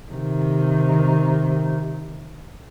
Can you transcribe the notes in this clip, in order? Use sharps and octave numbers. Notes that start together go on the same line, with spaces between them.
C3 D#3